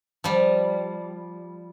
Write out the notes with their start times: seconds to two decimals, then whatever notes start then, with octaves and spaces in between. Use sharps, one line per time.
0.24 F3 G3